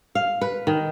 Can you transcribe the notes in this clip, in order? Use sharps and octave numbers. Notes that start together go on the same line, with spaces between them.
F5
B4
D#3